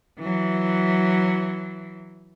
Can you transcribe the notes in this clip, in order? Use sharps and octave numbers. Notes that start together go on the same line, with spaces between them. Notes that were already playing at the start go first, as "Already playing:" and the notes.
E3 F#3